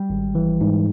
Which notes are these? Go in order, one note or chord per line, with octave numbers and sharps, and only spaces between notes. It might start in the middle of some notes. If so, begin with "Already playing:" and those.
Already playing: G3
G#1
E3
G#2